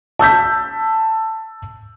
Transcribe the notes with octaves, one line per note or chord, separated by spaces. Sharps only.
A5 E6 G6 B6